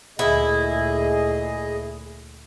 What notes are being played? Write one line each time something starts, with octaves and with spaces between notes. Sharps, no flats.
D2 A#2 E4 G#4 D#5